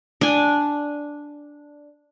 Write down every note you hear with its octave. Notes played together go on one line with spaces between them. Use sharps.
D4 G#5